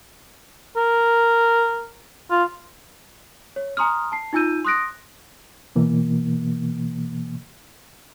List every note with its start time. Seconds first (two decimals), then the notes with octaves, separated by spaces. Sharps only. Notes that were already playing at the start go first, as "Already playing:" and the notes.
0.77 A#4
2.31 F4
3.56 C#5
3.77 G#5 A#5 C6 D#6 F6
4.12 A5 C7
4.33 D#4 F4 G#5 E6 G6 D#7
4.65 C6 D#6 F#6 A#6 D7
5.76 B2 E3 A#3